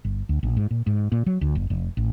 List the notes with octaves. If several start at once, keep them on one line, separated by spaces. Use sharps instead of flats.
G1
D2
A#1
G#2
A#2
G#2
A#2
F#3
D2
F#1
F1
A1